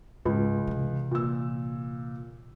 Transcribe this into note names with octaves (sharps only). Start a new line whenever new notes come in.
C#2 G#2 G#3
C3 E3
A#2 E6